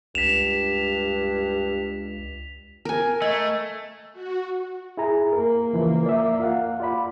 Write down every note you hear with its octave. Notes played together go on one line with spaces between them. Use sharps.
C#2 G2 B6 E7 F7
A#4 G#5
A3 D#5
F#4
E4 G#4 A#5
A#3 A#4
C#3 E3 F3
D5 E5
F4 F5 F#5
F4 D5 B5